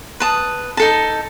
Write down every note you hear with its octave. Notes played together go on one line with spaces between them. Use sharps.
B4 A5 D#6
D#4 A4 A5